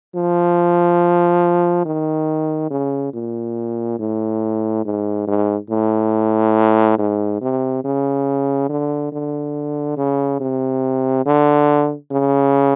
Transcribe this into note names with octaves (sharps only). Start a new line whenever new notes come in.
F3
D#3
C#3
A#2
A2
G#2
G#2
A2
G#2
C3
C#3
D3
D3
C#3
C3
D3
C#3